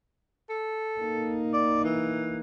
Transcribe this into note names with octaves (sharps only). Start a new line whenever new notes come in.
A4
A#3 D#4
D5
E3